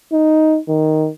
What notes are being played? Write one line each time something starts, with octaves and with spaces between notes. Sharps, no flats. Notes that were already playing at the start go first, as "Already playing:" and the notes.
D#4
D#3